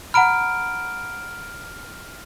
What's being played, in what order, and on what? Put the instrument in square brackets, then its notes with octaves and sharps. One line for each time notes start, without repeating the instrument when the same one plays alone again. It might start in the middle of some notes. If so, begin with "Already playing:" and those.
[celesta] F#5 A#5 B5 [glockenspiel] F6 D7